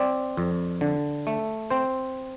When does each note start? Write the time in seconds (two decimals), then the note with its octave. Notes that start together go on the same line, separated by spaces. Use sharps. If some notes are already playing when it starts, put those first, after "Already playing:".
Already playing: C4 D5
0.37 F2
0.81 D3
1.27 A3
1.70 C4 C5